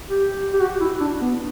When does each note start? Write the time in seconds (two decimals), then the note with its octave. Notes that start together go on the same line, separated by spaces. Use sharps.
0.09 G4
0.53 G4
0.60 F#4
0.81 E4
1.00 D4
1.21 B3